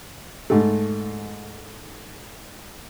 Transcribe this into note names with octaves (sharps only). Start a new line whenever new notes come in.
G#2 A3